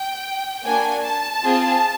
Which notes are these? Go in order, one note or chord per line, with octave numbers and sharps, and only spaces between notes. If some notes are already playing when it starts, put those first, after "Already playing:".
Already playing: G5
A#3 D4 F#4 G#5
A5
C4 F4 G#4